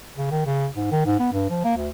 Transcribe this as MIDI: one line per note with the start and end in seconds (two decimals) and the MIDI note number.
0.18 0.31 49
0.31 0.46 51
0.46 0.67 49
0.77 0.87 44
0.92 1.03 51
1.06 1.16 44
1.19 1.29 59
1.33 1.47 43
1.50 1.60 53
1.65 1.76 58
1.77 1.89 38